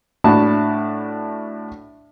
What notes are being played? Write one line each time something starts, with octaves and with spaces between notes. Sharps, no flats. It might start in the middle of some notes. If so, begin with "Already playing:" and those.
A2 D4 F#4 A5 B5